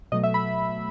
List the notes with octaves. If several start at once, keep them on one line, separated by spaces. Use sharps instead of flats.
B2 F#3 A3 D#5
E5
B5